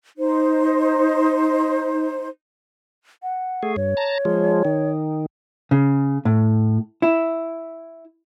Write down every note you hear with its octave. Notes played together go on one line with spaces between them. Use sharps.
D#4 C5
F#5
A3 G#4
G2 C#5
A5 A#5
F3 G#3
D#3
C#3
A2
E4